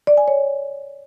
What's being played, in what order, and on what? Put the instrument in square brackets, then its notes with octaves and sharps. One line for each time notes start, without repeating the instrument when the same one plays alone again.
[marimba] D5
G#5
C#5